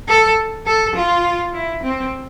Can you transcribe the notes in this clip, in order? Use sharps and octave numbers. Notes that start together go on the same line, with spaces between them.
A4
A4
F4
E4
C4